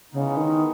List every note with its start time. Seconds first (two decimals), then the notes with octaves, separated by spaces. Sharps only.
0.12 C#3 E3 G#3 B3 D#4
0.37 D#3